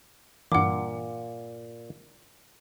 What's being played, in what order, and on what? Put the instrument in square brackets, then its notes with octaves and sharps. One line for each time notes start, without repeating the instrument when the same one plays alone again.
[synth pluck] G2 E3 [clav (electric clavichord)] A#2 [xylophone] F#5 D6